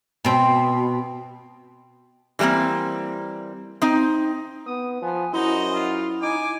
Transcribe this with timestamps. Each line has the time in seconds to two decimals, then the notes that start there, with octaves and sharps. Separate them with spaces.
0.25 B2 C4
2.39 E3 G3 A3 A#3 C4
3.82 C4 D#4
4.66 B3 D#6
5.02 F3 B3 G#5
5.33 F#2 D#4 E4 F#4 C5 D#5
5.74 F4
6.22 D#4 G#5 D6